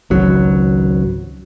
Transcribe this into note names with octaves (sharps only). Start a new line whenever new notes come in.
G#1 C#2 F#3